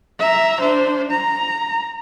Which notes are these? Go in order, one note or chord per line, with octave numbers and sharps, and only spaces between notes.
E5 A#5
D4 C5
A#5